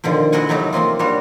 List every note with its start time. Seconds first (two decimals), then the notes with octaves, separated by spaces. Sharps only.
0.04 B2 D3 D#3 F3
0.32 E4 F#4 A#4 D#5 F#5 G#5
0.49 C3 F#3 A3 D#4 G4
0.73 F3 A#3 C4 F4
0.99 G3 A#3 D4 F#4 C#5